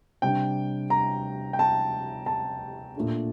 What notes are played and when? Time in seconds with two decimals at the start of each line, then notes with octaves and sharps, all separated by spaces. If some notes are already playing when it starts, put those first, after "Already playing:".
0.22 C3 G3 D4 G5
0.90 A#5
1.53 G5
1.59 A5
2.26 A5
2.95 A#2 A3 D4